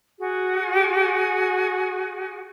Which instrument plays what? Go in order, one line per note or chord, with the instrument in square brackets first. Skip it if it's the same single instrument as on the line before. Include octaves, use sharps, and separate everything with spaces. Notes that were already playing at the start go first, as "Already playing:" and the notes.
[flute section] F#4 G#4